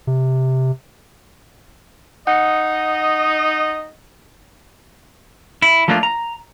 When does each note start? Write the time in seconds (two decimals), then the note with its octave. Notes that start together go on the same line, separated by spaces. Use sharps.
0.07 C3
2.27 D#4 D#5 F#5
5.62 E4
5.88 F3 A3 A#3 D4 F4
6.03 A#5